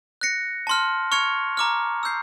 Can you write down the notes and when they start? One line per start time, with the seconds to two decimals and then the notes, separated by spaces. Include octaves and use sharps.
0.21 F#6 A#6 C#7
0.67 A5 C6 F6
1.12 C#6 F6 G#6 C#7 F7
1.57 A#5 D6 F6
2.03 E6 G6 C7